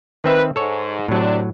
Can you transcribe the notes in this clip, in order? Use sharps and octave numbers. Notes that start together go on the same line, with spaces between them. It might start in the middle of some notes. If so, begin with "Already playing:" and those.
D#3 C4 B4 E5
G#2 A4 C#5
A2 C3 F#3 D4